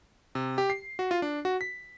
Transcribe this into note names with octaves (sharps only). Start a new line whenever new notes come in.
C3
G4
C7
F#4
F4
D4
F#4
B6